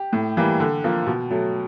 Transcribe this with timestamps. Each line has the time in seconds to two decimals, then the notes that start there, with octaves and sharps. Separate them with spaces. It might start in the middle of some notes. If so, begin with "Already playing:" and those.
Already playing: G4
0.13 A2
0.37 E3 G3 A#3
0.60 D3
0.84 F3 A#3
1.07 B2
1.30 F#3 A3